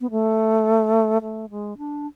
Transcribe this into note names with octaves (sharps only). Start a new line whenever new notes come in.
B3
A3
A3
G#3
D4